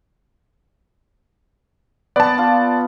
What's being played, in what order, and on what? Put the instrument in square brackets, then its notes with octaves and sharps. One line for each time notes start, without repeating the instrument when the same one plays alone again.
[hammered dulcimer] B3 [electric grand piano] D5 A5
[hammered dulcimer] F4